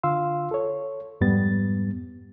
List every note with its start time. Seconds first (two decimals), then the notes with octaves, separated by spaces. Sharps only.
0.03 D3 F4 F5 C6 E6
0.51 A4 C#5
1.21 F2 G#2 G3 B3 A6